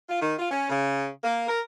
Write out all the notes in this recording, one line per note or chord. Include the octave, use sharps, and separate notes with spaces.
F4
D#3
F4
C#4
C#3
A#3
A#4